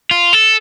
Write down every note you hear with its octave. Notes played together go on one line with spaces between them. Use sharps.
F4
A4